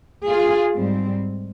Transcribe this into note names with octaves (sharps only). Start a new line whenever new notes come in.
F4 G#4
G#2 G3 C4